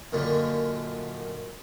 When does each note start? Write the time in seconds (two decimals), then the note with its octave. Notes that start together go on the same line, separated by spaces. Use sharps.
0.13 F#2 A#2 D3 D#3